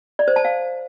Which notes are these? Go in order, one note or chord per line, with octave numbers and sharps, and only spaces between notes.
D5
C5
A5
F5